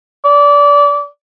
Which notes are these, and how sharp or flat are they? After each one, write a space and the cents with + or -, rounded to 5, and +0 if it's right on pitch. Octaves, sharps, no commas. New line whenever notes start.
D5 -25